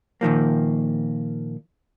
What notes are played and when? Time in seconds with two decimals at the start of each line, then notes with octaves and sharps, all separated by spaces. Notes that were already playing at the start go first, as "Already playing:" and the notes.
0.21 A#2 D#3 F3 A#3